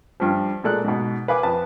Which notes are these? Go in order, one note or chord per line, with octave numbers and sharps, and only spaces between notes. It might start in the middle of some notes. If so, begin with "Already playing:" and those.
G2 F3
A#2 G#3 A4 D5 F#6
G#2 B2
B4 F5 G#5 D6
F2 B4 A5